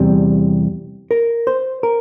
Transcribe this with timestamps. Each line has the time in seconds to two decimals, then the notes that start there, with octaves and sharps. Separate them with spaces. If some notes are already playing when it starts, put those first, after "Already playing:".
Already playing: E2 C3 G3
1.11 A#4
1.47 C5
1.83 A#4